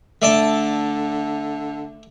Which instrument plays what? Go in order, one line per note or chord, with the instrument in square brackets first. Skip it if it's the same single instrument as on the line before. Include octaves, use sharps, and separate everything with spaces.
[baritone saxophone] D3 [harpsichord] A3 D5 A5